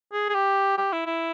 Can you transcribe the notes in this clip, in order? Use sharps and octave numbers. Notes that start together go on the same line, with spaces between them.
G#4
G#4
G4
G4
E4
E4